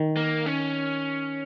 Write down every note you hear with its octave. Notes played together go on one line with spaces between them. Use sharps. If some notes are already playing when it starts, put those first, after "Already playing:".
Already playing: D#3
A#3
C#4